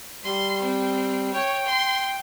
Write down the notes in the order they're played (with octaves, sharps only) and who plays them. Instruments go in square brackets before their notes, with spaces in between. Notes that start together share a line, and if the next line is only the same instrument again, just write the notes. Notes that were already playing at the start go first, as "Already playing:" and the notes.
[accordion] G3 [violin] C6
[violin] C4
[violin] C#5 [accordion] G5
[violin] C6